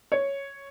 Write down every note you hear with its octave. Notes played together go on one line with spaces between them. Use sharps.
C#5